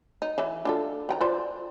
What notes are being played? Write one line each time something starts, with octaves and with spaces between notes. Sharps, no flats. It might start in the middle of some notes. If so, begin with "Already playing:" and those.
D#4
E3 E4 E5
D4 F4 A4
D#3 G5 A#5
F4 C5 D5